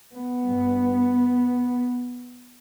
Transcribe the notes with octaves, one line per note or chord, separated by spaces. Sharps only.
B3
G2